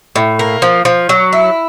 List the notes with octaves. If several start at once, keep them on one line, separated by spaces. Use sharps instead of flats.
A2
A#3
F3
F3
F#3
E4